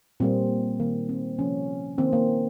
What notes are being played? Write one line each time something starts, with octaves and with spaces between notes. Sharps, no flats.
A#2 G3 A#3 C4
D#3 A#3
C4
C3 F3 A#3 C#4
D#3 A#3 C4
A#3